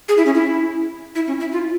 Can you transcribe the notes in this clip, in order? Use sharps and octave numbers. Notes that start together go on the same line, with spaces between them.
G#4
E4
C#4
E4
E4
C#4
E4
F4